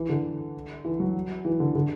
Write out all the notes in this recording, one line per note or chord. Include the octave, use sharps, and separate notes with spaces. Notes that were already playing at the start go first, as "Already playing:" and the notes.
Already playing: E3
D3
E3
F#3
E3
D3
D3